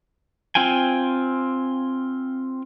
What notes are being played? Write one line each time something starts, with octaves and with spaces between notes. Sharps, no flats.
C4 F4 G5 G#5